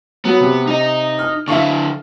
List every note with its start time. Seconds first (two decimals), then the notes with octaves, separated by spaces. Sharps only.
0.25 F#3 B3 F#4
0.41 C3
0.67 D#4 D#5
1.19 F6
1.48 D3 E4 E5 F5 C#6